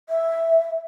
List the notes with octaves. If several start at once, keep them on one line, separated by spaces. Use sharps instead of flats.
E5